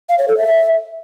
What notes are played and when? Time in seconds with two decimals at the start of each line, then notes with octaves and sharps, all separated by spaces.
0.09 F5
0.18 C#5
0.28 A4
0.38 E5